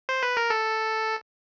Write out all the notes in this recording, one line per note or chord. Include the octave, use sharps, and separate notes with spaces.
C5
B4
A#4
A4